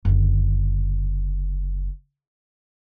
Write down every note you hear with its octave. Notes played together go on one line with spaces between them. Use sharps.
F#1 D3